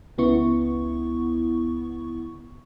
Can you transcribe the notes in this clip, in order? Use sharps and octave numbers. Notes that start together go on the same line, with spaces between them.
C#2 C#3 B3 E4 C#6